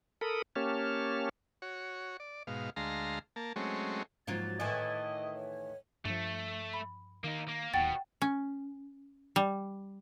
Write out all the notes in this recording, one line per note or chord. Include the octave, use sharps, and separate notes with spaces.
A4 A#4 B5 D#6
A#3 C#4 G4 C#5 A5 F6
F#4 C#5
D5
G#2 B2 F5
D2 G#3 F5 A5 A#5 C6
A#3 A5
F#3 G#3 A3 C4 C#4
G#2 F3 F#3 A#3 F4 A6
A2 D#3 E3 D#5 E5 G#5
C#5
G2 F3 A3
B5
D#3 A#3 D#4
A#3
D1 D#2 B2 F#5 G5 A6
C#4
G3